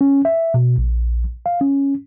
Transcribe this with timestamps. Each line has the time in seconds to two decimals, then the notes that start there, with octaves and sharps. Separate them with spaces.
0.01 C#4
0.25 E5
0.54 B2
0.78 A#1
1.46 F5
1.61 C#4